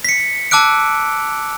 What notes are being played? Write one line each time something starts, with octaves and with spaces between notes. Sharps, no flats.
B6 C#7
A5 D6 E6 F#6 D7